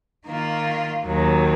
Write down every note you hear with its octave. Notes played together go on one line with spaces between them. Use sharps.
D#3 A#3 F4
D#2 D#3 F#3